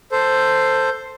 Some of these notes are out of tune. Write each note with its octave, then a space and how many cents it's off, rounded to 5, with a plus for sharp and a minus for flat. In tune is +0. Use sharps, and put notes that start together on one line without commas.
A4 +10 C5 +0